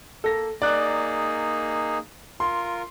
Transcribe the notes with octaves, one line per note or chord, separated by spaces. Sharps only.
A#3 A4 A#6
A#3 D#4 G#4 D5 F#6
F4 A#4 C6